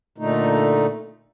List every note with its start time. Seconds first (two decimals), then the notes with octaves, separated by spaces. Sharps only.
0.18 A#2 D3 A3 D#4